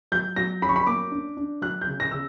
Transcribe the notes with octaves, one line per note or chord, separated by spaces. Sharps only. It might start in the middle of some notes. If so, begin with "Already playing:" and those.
F#3 G6
F#3 A#6
C#4 B5
C#6
B5
A#3 D6
D4
D4
F#3 F#6
G6
C#3
A#6
C#3 E6